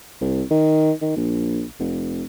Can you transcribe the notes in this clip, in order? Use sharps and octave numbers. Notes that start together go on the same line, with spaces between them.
C2
D#3
D#3
A#1
F1